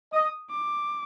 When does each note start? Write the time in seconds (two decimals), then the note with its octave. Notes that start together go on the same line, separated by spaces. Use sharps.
0.13 D#5 D#6
0.51 D6